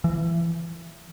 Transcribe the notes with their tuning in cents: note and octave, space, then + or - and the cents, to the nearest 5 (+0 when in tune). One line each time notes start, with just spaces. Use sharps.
E3 +25